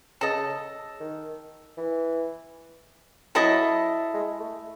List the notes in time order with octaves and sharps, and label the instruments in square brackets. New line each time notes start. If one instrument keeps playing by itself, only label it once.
[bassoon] C#3 [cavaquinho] A4 D#5 A5
[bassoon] D#3
E3
[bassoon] F#3 [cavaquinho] E4 A4 D#5 A5
[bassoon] G#3
A3